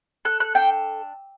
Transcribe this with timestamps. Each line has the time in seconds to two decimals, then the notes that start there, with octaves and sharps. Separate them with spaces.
0.25 A4 F#6
0.40 F#6
0.55 D4 G5